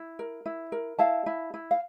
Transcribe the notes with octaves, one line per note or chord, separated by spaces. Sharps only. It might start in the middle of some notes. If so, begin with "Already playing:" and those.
Already playing: E4
A#4
E4
A#4
E4 F5 A5
E4
E4
F5